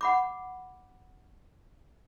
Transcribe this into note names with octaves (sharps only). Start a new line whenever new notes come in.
F#5 B5 D6